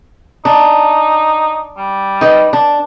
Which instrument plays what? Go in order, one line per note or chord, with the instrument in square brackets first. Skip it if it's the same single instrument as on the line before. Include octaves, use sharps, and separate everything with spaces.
[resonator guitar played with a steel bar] D4 [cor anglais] D#4
[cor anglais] G3
[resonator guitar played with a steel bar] D#4 B4 D#5
D4